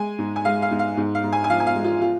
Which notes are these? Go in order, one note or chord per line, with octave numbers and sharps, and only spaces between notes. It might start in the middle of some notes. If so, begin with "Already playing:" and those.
Already playing: G#3 G#5
G#2
G#5
G#3 F5
F5
G#2
F5
G#2
F5
G#2
G#5
G#5
F3 F5
G#5
F5
G#3
F4
F4